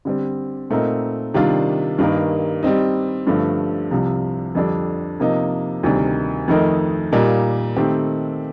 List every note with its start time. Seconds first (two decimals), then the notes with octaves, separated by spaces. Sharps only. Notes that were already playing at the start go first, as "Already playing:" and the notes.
0.05 D3 G3 C4
0.70 A#2 A3 C4 D#4 A#4
1.34 C3 D#3 G3 D4 F4
1.98 G2 D#3 A#3 D#4 A#4
2.63 G3 C4 D#4
3.27 G2 D3 F3 A3
3.91 C2 C3 F3
4.55 F2 D3 G3 D4 A4
5.20 C3 F3 A#3 D#4
5.83 D2 C3 D#3 G3
6.48 F2 D#3 A3 D#4 A#4
7.12 A#2 G3 A#3 D#4
7.76 D#3 A3 C4 G4